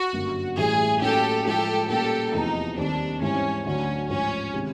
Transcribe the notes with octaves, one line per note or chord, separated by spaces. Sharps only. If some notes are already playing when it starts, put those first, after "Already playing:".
Already playing: F#4
G1 F#2 D3 F#3 A#3
A1 A2 E3 G3 G#4
A2 F#3 A#3 C#4 G4 A4
A2 F3 G#3 G4 A4
A#2 G3 A#3 C#4 F#4 G4 A4
F1 E2 C3 F3 D#4
D#2 D#3 G3 C4 D4
G#2 E3 G3 C4 C#4 E4
D2 D3 F#3 C#4
A1 G#2 F3 C#4
C3 D#3 G#3